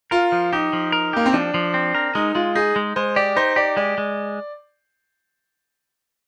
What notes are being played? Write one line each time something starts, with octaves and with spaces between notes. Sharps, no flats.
F4 A#4
F3
D#4 G4
F3
A#4
A#3 G4
C4
F3 D4
F3
C4
A#4
G#3 D#4
G#3 F4
D#4 G#4
G#3
G#3 C5
G4 D5
D#4 C5
G4 D5
G#3 D5
G#3